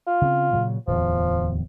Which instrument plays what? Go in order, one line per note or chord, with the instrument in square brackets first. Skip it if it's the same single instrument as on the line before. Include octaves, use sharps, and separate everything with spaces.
[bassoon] F4
[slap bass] C#3 C4
A#2 C#3 F#3
[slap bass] D1 E2 [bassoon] F3